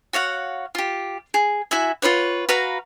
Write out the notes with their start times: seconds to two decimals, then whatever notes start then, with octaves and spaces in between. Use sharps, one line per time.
0.13 F#4 C#5 F5 F#5
0.75 F4 G4
1.34 G#4
1.71 E4 F#4 E5 G#5
2.02 F4 B4 C#5 F#5
2.49 F#4 B4 F5 A#5